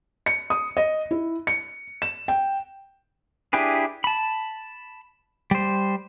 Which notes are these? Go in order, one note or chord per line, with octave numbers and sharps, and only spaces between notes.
C#7
D#6
D#5
E4
C#7
E7
G5
D4 E4 G4 G#4 B4
A5 B5
G3 C5